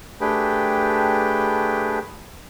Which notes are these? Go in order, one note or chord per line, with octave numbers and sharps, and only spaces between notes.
A3 D4 G4 G#4 B4 G5